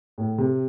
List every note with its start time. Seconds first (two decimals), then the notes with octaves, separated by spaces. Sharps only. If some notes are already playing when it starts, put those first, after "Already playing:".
0.18 A2
0.38 C3